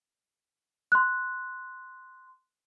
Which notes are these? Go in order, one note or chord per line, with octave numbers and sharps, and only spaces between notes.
C6 F#6